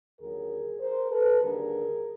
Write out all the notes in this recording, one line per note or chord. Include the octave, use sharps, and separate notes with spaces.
D#2 D3 F#3 G#4 A#4
A#4 C5
A4 B4
D#2 D3 G3 G#4 A#4